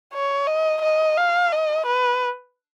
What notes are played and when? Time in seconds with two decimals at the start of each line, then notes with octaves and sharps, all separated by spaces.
0.14 C#5
0.47 D#5
0.82 D#5
1.17 F5
1.52 D#5
1.86 B4